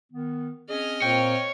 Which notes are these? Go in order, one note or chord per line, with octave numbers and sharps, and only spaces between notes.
D#3 B3
C4 C#4 G#4 D#5 F6
A#2 A#3 C4 C#5 G5